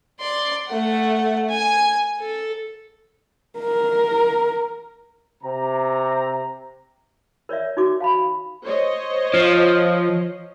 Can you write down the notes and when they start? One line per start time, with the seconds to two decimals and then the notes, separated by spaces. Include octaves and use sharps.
0.20 D5 C6
0.67 A3 F#5
1.49 G#5
2.20 A4
3.59 A#4
5.43 C3 A#5
7.49 A#4 C#5 D5 E5
7.77 D#4 F#4 D6
8.01 F5 A5 B5
8.64 C5 C#5 D#5
9.34 F3